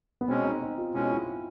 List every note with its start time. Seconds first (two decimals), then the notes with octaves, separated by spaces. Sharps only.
0.21 B3
0.28 B2 G#3 C4 C#4
0.44 D#4
0.62 D#4
0.78 F4
0.94 B2 G#3 C#4 E4
1.10 E4